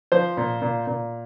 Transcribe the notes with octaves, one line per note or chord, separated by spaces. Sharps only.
F3 C5
A#2
A#2
A#2